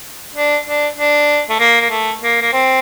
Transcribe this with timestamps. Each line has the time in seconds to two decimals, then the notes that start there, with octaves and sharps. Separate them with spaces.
0.35 D4
0.66 D4
0.97 D4
1.50 A3
1.60 A#3
1.81 A#3
1.90 A3
2.22 A#3
2.41 A#3
2.53 C4